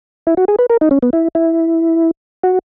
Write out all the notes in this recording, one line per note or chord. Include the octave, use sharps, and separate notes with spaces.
E4
F#4
G#4
B4
A#4
D#4
C#4
B3
E4
E4
F#4